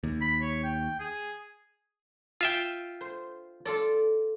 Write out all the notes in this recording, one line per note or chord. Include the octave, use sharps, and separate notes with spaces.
D#2
B5
C#5
G5
G#4
F4 E5 G5
C5
F4 A4 D5